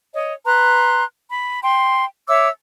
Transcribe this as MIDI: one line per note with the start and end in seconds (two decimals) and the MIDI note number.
0.13 0.33 73
0.13 0.33 75
0.45 1.03 71
0.45 1.03 82
0.45 1.03 84
0.45 1.03 90
1.30 1.59 83
1.62 2.05 79
1.62 2.05 84
2.28 2.48 73
2.28 2.48 76
2.28 2.48 86
2.28 2.48 88